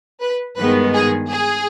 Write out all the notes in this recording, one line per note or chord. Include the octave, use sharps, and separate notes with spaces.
B4
G2 D#3 G#3 B3 B4
G#4
G#4